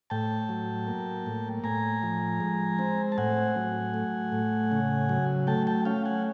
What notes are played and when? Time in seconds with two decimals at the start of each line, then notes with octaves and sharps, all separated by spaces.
0.10 A2 G5 A5
0.49 F#3
0.87 A#3
1.26 A2
1.64 A2 G#5 A#5
2.03 F3
2.40 G#3
2.79 C4
3.12 A5
3.18 A2 F#5 G#5
3.56 F#3
3.94 A3
4.32 A2
4.72 C#3
5.09 F#3
5.47 A3 G5 A5
5.67 G5 A5
5.85 C#4 F5 G5
6.05 F#5 G#5